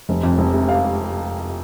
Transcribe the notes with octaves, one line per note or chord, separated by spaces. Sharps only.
F1
F2
F1
C3
F5